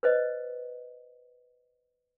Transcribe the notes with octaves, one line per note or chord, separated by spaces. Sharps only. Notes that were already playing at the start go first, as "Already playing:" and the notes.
B4 C5 D#5